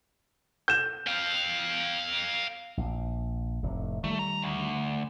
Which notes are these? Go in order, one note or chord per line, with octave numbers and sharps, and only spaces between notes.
G6 E7
F5 G5
A#1
F1 A2 C3
D#3 G3 A3
A#5
D2